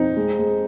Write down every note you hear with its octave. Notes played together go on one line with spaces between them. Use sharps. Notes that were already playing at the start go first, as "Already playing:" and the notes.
Already playing: F2 D#4
G#3
G#3